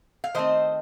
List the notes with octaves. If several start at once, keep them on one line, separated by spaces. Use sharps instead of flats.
F5
D#3 A3 C4 C5 D#5